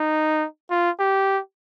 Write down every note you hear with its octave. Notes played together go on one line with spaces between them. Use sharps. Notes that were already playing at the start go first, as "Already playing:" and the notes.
Already playing: D#4
F4
G4